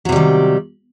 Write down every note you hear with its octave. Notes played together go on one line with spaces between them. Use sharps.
C3 D#3 F#3 G3